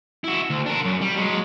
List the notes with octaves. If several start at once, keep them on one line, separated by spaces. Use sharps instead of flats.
E4 F#4
D2
D4 A#4
F#2
G3
F#3 G#3